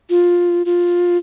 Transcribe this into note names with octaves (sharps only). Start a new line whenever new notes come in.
F4
F4